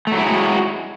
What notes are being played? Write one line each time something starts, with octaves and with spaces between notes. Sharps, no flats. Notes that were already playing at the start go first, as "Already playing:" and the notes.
F#3 G#3 A3 E4 F#4